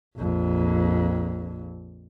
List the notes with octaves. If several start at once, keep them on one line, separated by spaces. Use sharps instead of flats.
A#1 F2